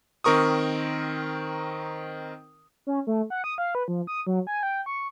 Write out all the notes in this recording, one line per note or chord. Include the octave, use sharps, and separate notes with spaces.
D#3 C4 A#4 C#6 D#6
C#4
A3
F#5
D#6
F5
B4
F3
D#6
F#3
G#5
G5
C#6